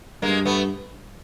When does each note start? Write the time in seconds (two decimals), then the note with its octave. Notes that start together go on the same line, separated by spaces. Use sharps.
0.22 G2 G#3 A#3
0.45 A3 B3